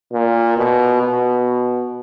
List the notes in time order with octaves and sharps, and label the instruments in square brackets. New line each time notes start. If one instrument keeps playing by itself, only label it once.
[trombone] A#2
B2
B2